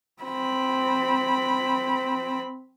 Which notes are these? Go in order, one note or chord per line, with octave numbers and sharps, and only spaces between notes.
C4 B5